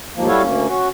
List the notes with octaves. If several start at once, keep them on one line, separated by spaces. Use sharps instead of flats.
D#2 G#2 F3 A#3
G3 E4 F#4 A4 C#5 F5
D2 A#3 C#4
C#4 F#4